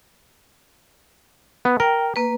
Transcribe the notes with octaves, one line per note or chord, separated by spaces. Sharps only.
B3
A#4 G5
A#3 B4